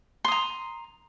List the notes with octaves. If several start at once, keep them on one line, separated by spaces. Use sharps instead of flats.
A#5 C6 D#6